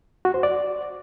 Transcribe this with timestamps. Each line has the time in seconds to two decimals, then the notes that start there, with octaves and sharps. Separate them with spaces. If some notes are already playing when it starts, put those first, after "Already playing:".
0.25 F#4
0.34 C5
0.43 D5